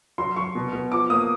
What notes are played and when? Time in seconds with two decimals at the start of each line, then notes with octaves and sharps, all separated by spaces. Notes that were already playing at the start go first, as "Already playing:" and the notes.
0.18 F#3 C6
0.36 F#3 C#6
0.55 B2
0.73 B2
0.92 F3 D6
1.10 A#3 D#6